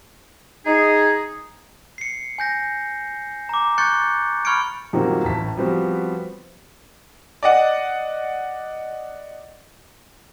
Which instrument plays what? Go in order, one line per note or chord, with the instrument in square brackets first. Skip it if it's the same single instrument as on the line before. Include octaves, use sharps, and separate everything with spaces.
[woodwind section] D#4 G#4
[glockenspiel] C7 C#7
G#5 G6 A#6
A#5 D6
C#6 F#6 G6 A6 C#7
B5 C#6 F6 G#6 C#7 D7
[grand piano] F#2 A#2 D#3 G3 C4 F#4
A1 A2 A5 B6
F3 G3 B3 C4 F#4
D5 D#5 F#5